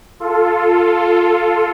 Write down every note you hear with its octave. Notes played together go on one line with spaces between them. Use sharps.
F4 A4